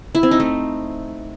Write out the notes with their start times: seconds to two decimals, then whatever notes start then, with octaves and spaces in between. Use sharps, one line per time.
0.15 E4
0.23 C4
0.31 D#4
0.40 A3